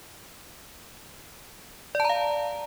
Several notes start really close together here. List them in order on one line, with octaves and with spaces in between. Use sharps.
D5 A5 A#5 F5